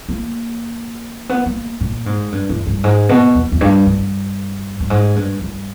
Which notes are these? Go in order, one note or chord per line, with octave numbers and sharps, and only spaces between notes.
A#3
B3
A#3
A#2
G#2
G2
E2
G2
G#2
B2
E2
E2
G2
G2
G2
G#2
G2
G2